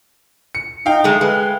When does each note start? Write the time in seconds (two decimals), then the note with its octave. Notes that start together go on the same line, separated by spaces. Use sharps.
0.55 C#7
0.86 D#4 F5 G5
1.04 G#3 A3
1.21 G#3 B4